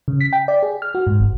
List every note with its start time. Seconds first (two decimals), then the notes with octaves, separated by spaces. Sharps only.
0.08 C#3
0.21 B6
0.33 G5
0.48 D5
0.63 G#4
0.82 F6
0.95 F#4
1.07 G#2
1.20 G1